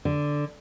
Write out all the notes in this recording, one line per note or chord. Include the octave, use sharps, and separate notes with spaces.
D3